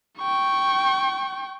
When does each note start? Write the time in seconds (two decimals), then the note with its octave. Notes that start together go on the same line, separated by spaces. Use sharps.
0.18 G5 C#6